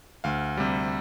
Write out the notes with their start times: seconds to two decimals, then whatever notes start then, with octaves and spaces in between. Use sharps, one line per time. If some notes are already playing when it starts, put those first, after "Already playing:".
0.24 D2 F5
0.57 C3 G3